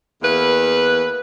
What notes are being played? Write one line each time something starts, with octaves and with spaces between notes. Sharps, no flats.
E2 A#3 B4